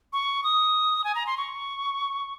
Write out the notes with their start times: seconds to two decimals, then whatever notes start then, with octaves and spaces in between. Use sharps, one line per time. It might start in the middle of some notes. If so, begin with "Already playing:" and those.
0.13 C#6
0.44 D#6
1.04 G#5
1.15 A#5
1.27 C6
1.37 C#6